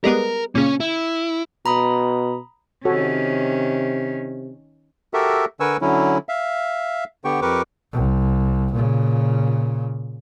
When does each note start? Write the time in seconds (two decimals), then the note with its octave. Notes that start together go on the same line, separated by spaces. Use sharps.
0.04 G3 G#3 B3 A#4
0.55 A#2 C#3 C#4
0.80 E4
1.66 B2 A#5 B5 D#6
2.85 C3 D#3 C#4 F#4 A4 C#5
5.14 F#4 G4 A4 A#4 E5
5.60 D3 A#4 B4 G#5 C#6 E6
5.81 D3 F#3 C#4 E4
6.29 E5 F5
7.25 D3 B3 G4 G5 C#6
7.42 F2 G4 A#4 B4 C#6 D6
7.93 C2
8.73 A#2 C#3